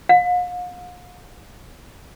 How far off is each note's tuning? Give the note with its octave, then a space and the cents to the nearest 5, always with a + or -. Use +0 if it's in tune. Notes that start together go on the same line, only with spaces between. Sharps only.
F5 +40